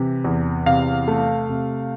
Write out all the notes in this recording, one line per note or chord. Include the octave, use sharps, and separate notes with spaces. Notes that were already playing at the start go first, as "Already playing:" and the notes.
Already playing: C3 E3
E2
C3 F5
A3
C3